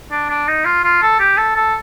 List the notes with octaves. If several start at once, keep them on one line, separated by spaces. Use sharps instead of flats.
D4
D4
D#4
F4
F4
A4
G4
A4
A4